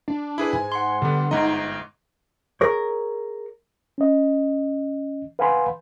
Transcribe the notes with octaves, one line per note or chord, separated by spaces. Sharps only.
D4
E4 G#4 B4
G#2 G#5
F#5 C6
D3 G3 B3
G1 G#2 D#4 D#5
G#4 A#4 C#5
C#4 D#5
B4 F5 F#5 G#5 B5 C6